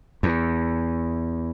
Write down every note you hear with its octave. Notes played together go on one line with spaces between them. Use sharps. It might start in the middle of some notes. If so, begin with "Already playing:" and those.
E2